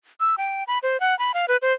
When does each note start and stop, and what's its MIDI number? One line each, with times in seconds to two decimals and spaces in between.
0.20 0.35 88
0.38 0.64 79
0.67 0.78 83
0.83 1.00 72
1.00 1.17 78
1.19 1.32 83
1.34 1.46 77
1.48 1.57 71
1.62 1.73 72